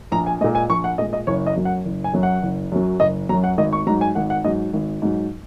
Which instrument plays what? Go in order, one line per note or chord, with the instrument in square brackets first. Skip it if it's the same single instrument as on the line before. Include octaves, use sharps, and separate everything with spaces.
[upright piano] A#1 A#5
G#5
G#3 D#5
A#2
G#5
A#1 C#6
F#5
A#2 G#3 D#5
D#5
F#1 C#5
D#5
F#2 F#3
F#5
F#1
G#5
F#2 F#3
F#5
F#1
F#2 F#3
F#1 D#5
F#3 A#5
F#2
F#5
G#1 D#5
C#6
G#2 F#3 A#5
G#5
G#1 F#5
F#5
G#2 D#5
F#3
G#1
G#2 F#3